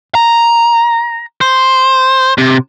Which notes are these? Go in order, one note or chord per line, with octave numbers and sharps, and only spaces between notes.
A#5
C5
C3